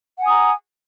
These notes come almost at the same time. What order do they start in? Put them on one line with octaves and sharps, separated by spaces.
F#5 G#5 D#6 A#5